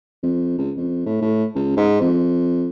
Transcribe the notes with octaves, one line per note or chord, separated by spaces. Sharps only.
F2
C#2
F2
A2
A2
C#2
G#2
F2